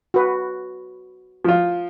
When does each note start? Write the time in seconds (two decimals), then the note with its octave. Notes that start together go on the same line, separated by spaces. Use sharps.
0.14 F#4 B4
1.45 F3 F4